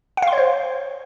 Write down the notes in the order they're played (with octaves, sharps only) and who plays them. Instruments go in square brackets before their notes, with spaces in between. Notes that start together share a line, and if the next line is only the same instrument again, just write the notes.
[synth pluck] F#5
F5
C6
C#5
C5